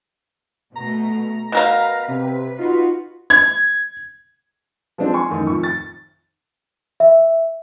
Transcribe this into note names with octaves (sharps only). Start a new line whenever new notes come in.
B2 A3 A#5
B2 A#4 B4 F5
C3
D#4 F4 F#4 B4
G#6
F3 G#3 C4 D4
G#5 C6 C#6
A1 F#2 D#3
F2 C#6
A6
E5